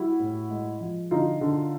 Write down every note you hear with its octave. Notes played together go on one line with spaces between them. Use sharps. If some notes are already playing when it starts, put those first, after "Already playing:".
Already playing: G3 E4 F#4
A2
G#3
F3
D3 D#4 F4
D3